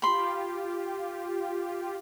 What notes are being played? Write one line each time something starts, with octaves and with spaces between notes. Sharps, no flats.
F4 G4 B5 C6